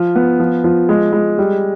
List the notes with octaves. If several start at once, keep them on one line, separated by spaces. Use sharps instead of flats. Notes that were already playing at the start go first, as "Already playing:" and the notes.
Already playing: F3
B3
F3
F3
G#3
G#3
G3